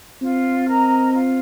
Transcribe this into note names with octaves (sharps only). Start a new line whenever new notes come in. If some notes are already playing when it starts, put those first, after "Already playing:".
C4 F4
A#4 D#5 A#5
F4